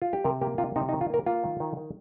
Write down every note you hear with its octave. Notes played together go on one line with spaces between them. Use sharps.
F4
G4
C3 A#4
A#3 G4
C3 F4
C3 D#4
D#4
D#3
F4
A#3 A#4
A#3 F4
D#3
D#3
D#3